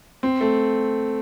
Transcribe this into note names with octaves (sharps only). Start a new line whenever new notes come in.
C4
A3